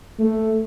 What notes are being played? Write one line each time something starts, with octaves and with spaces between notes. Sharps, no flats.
A3